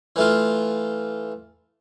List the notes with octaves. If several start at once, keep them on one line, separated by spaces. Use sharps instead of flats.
E3 A3 F4